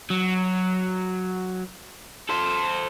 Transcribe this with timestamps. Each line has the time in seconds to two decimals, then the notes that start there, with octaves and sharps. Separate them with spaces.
0.10 F#3
2.29 A4 C5